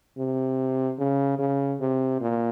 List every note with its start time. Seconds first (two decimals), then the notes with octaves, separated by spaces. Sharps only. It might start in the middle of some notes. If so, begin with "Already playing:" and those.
0.18 C3
0.99 C#3
1.39 C#3
1.80 C3
2.21 A#2